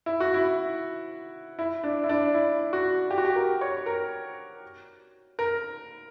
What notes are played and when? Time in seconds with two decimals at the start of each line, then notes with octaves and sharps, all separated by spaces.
0.06 E4
0.20 F#4
0.34 E4
1.59 E4
1.84 D4
2.04 E4
2.09 D4
2.34 E4
2.73 F#4
3.11 G4
3.18 F#4
3.25 G4
3.36 A#4
3.61 C#5
3.86 A#4
5.39 A#4